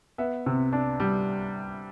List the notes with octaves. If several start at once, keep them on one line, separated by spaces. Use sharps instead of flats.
B3 E5
C3
D4
G3